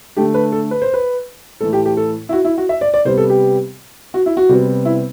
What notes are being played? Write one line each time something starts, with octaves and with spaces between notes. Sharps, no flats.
D3 A3 G4
B4
A4
B4
C5
B4
A2 E3 A3 A4
G4
G4
A4
E4
F#4
E4
F#4
E5
D5
D5
C3 G3 B3 C5
A4
G4
F#4
E4
F#4
C3 G3 B3
E4